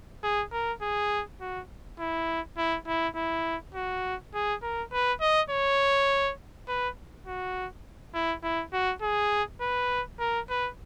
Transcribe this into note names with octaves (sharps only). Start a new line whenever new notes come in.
G#4
A#4
G#4
F#4
E4
E4
E4
E4
F#4
G#4
A#4
B4
D#5
C#5
B4
F#4
E4
E4
F#4
G#4
B4
A#4
B4